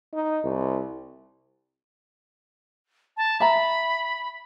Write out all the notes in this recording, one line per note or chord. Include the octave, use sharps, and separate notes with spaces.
D#4
C2
A5
E5 A#5 B5